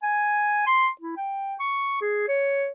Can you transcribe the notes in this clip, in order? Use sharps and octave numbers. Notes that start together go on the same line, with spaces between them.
G#5
C6
E4
G5
C#6
G#4
C#5